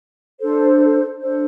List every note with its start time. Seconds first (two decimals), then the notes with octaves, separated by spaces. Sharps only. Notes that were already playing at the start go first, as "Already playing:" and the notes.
0.40 D4 A4 C5
1.19 D4 A4 C5